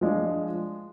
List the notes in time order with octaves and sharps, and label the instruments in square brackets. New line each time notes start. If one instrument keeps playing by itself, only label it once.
[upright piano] F3 G#3 D4